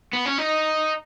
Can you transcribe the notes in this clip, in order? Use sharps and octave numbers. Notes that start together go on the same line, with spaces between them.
B3
C#4
D#4